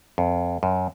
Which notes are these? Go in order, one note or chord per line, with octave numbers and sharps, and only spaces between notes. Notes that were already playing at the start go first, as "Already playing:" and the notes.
F2
F#2